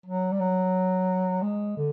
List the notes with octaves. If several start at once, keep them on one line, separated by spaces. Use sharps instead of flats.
F#3
G3
F#3
G#3
D3